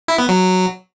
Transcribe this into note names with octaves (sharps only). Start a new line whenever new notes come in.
E4
B3
F#3